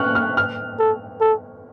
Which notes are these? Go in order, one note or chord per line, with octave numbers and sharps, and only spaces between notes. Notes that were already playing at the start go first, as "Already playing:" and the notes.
Already playing: C#6 F6 F#6
F6
F6
A4
A4